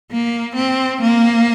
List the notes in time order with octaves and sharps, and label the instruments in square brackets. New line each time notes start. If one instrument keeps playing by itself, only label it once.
[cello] A#3
C4
A#3